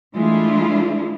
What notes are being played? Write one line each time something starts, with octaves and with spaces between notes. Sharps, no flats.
E3 G#3 A3 D4 E4 F4